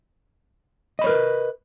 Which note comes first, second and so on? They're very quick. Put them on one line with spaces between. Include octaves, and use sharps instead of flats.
D#5 B5 C#5 A#4 B4